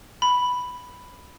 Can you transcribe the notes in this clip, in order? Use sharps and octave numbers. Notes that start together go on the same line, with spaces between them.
B5